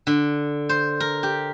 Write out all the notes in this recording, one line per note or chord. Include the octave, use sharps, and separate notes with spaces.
D3
C5
A#4
G4